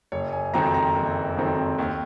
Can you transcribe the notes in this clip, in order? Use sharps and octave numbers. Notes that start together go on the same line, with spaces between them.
F#1 C#5
G#5
F2 D#3 F#3 C4 A#5
A#5
F#1
F2 D#3 F#3 C4
D#2